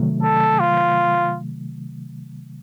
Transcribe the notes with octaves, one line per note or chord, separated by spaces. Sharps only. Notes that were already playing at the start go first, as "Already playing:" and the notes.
Already playing: C3 D#3 F#3 A3
A4
F4